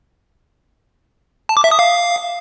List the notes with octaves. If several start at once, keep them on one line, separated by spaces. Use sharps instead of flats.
A5
D6
E5
D#6
F5